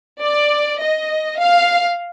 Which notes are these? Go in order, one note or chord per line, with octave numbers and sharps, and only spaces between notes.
D5
D#5
F5